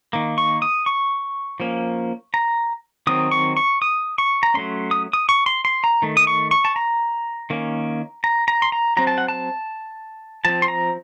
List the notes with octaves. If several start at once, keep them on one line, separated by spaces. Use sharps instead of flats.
D#3 A#3
C#6
D#6
C#6
F3 A#3 C#4
A#5
D#3 F#3 C4 D#6
C#6
C#6
D#6
C#6
A#5
F#3 A3 C#4 C6
D#6
D#6
C#6
C6
C6
A#5
D#3 A3
D#6
C#6
C#6
A5
A#5
D#3 A#3 C#4
A#5
A#5
C6
A#5
F#3 C4 A#5
A5
F#5
A5
F3 C4 A5
C6
A#5